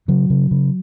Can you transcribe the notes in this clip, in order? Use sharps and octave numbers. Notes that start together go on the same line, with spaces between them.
C#3 F#3
C#3
C#3